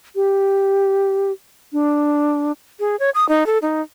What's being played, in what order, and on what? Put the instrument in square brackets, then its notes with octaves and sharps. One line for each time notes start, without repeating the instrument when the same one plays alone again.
[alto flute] G4
D4
[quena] G#4
C#5
D#6
D#4
A4
D#4